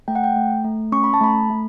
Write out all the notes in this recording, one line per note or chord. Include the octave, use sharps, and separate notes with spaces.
A3 G5
F#5
G5
A3
A3
C#4 C#6
B5
A5
A3 B5
A3